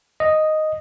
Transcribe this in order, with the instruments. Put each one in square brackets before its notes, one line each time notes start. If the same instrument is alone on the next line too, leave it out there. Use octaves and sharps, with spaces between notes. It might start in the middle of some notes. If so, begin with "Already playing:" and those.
[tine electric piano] D#5